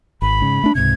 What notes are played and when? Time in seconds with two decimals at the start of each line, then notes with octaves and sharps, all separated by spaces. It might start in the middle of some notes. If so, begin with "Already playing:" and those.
0.22 G#1 B5
0.41 G#2 C#3
0.64 A3 D4
0.75 C#2 G#2 C3 G#6